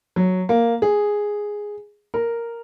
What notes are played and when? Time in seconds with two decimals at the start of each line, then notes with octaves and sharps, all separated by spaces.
0.16 F#3
0.49 A#3
0.82 G#4
2.14 A#4